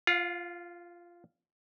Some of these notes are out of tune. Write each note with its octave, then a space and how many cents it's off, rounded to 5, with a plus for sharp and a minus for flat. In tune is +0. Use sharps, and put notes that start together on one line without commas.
F4 -10 F5 +40